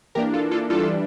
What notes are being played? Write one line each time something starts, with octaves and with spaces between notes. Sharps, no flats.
E3 A#3 D4 G4 A#4
F4 A4
F4 A4
E3 G3 D4 F4 A4